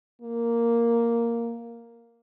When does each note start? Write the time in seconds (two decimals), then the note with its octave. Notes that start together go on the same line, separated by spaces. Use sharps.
0.22 A#3